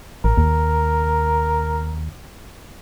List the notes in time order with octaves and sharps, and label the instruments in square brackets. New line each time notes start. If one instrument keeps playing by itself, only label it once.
[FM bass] A1 [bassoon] A#4
[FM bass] D#2